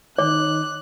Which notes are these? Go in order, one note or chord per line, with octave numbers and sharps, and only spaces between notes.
D#3 C#5 D6 F#6